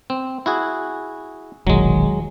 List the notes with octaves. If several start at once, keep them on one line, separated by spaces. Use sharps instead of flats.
C4
E4 F#4 G#4
E1 A#1 D#3 F#3 G#3